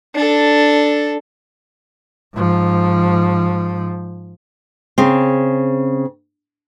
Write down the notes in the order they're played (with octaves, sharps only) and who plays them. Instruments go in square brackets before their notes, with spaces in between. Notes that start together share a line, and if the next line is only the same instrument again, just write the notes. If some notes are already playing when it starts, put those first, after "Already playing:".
[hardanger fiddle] D4 A4
[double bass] G#2 F3
[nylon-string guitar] C#3 C4